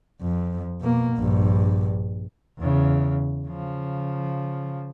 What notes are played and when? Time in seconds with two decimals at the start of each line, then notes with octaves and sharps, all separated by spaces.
0.22 F2
0.81 B2 A#3
1.17 A#1 G2
2.58 E2 C#3
3.48 C#3 F3